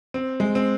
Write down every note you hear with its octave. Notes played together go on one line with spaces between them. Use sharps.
C4
G#3
C4